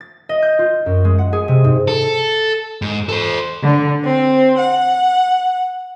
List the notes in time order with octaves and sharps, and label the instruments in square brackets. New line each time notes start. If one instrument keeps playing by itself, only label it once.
[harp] A6
D#5
G6
F4
F#2
G#3
F#5
G#4
C3
G#2
[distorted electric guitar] A4
G#2
A4 C5
[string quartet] D3
C4
F#5